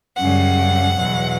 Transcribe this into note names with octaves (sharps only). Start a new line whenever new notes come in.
F#2 C#3 G3 F#5
E2 B2 F#3